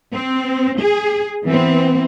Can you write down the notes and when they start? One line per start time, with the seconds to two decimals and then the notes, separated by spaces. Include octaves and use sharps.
0.14 C4
0.80 G#4
1.45 E3 B3 C4